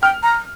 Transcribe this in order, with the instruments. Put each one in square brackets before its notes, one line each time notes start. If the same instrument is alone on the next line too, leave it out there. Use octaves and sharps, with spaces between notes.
[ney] G5 [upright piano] F6
[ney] A#5